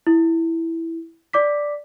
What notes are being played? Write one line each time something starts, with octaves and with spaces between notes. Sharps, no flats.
E4
D5 D6 B6